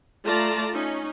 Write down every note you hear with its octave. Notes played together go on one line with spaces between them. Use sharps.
A3 F4 D5 A5 A#5
C#4 D#4